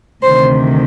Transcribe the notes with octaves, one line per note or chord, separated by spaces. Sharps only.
D2 C3 D#3 C5